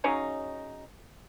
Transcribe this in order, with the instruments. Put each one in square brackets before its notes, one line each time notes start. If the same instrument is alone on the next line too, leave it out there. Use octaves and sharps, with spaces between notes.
[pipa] C#3 F#3 C#4 D#4